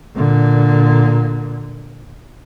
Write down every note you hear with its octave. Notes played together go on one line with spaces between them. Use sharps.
A#2 D3